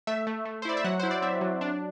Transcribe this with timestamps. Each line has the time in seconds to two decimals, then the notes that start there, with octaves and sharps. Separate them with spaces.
0.07 A3 E5
0.27 A3
0.45 A3
0.62 C5
0.65 E4 D5
0.77 E5
0.84 F#3 F#5
0.99 E4 C5
1.11 D5
1.22 C4 E5
1.41 F#3
1.61 D4